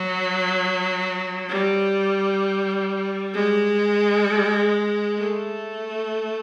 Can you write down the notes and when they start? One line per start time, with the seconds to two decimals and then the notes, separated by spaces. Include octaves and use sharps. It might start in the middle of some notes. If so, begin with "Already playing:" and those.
Already playing: F#3
1.49 G3
3.33 G#3
5.18 A3